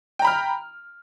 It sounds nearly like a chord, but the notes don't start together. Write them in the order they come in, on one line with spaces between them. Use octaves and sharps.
G5 A#5 B5 F6